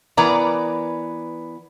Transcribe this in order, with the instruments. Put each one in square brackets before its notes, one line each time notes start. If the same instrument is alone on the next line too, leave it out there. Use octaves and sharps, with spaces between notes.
[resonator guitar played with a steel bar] E3 B3 A#4 D5 A#5